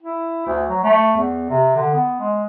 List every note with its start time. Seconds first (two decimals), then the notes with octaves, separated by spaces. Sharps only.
0.03 E4
0.47 D2
0.69 F#3
0.84 A3
1.16 E2
1.50 C3
1.76 D3
1.93 B3
2.20 G#3